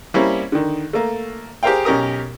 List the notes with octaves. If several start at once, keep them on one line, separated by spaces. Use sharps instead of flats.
G3 A#3 C4 C#4 E4
D3 D#3
A3 A#3
G4 G#4 A#4 C5 F5 G5
B1 C#4 G4 A#4 D#6